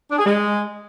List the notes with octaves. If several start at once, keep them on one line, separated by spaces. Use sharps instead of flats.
D4
G#4
G#3